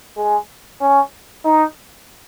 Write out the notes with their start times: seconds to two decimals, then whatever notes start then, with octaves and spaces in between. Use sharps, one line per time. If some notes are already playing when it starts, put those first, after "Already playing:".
0.17 G#3
0.81 C#4
1.45 D#4